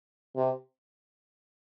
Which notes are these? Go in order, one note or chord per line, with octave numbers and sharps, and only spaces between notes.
C3